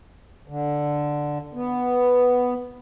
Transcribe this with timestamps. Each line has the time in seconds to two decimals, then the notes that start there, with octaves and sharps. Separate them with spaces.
0.48 D3
1.53 B3